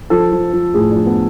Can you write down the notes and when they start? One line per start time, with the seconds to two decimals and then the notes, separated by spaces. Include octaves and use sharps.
0.10 F3 A4
0.32 F3
0.53 F3
0.74 A2 G#4
0.91 F3 D4
1.06 B3